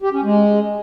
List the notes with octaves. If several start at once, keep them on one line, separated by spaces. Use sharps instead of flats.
G4
C#4
G#3